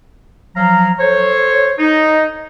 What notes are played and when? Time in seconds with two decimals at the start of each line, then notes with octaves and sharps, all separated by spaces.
0.56 F3 F#3 F5 A#5
1.00 A4 C5 C#5
1.80 D#4